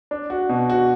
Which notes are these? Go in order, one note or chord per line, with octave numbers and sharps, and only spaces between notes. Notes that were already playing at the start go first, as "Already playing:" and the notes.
D4
F#4
B2
F#4